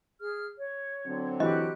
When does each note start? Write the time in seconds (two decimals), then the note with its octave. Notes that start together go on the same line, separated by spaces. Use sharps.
0.20 G#4 F6
0.58 C#5
1.06 D3 F#3 C4
1.40 E3 F#4 G4 D#5 F#6